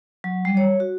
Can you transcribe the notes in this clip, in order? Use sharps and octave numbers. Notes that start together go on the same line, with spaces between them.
F#3
G3
C#5
F#4